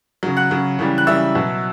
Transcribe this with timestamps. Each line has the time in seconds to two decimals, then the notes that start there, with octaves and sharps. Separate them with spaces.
0.23 C#3 F#3
0.37 F#5 F#6
0.51 C#3 F#3
0.79 C#3 E3 G3
0.98 F#6
1.07 C#3 E3 G3 E5 E6
1.35 B2 F#3